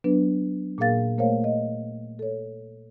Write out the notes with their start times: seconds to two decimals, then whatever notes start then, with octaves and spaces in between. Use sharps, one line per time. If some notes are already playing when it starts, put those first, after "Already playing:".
0.04 F#3 B3 D4 B4
0.78 A#2 A#3 G#4 A#4 F5 A6
1.18 A3 A#3 A#4 C5 C#5 F5
1.44 D#5
2.19 A4 C#5